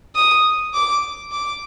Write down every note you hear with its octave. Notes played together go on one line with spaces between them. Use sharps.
D#6
D6
D6